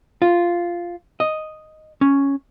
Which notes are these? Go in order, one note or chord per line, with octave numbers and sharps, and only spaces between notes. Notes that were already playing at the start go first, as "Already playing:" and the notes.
F4
D#5
C#4